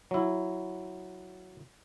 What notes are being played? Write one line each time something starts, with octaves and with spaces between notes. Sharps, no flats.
F#3 E4